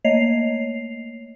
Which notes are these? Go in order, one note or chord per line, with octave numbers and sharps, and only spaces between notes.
A3 A#3 C#5 D#5 C7 F7